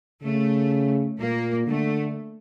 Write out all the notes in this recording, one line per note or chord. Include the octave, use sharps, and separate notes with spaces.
C#3 A3
A#2 A#3
D3 A3